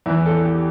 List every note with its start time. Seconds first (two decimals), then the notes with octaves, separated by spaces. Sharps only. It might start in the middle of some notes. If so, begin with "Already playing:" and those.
0.06 E2 E3 E4
0.26 A4
0.45 G4